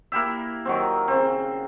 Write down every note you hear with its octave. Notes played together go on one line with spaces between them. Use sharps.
A#3 E4 G4 E5
D#3 F#3 C4
C#3 C4